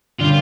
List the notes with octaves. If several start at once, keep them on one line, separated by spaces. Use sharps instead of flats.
D3 G3 A#3 F4